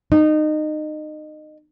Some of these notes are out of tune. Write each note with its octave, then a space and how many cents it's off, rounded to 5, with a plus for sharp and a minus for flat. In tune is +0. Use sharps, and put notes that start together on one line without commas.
D#4 -25